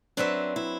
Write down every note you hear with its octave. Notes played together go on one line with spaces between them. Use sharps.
F#3 C4 D4 F#4 B4 E5
E4